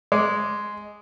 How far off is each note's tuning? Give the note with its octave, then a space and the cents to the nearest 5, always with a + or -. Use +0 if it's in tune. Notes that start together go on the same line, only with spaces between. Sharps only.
G#3 +0 D6 -5